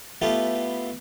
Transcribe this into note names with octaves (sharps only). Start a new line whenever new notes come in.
A3 B3 E4 F4 G4 A4